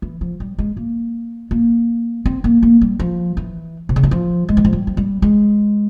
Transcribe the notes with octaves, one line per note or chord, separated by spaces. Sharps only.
E3
F3
G3
G#3
A#3
A#3
C4
A#3
A#3
G3
F3
E3
C3
C#3
E3
F3
G#3
E3
F3
G3
F3
G3
G#3